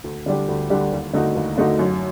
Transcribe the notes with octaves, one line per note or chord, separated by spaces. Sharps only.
D2
D3 G3 D4 G4
D2
D3 G3 D4 G4
D#2
D3 A3 D#4 F#4
D#2
D3 A3 D#4 F#4
F#2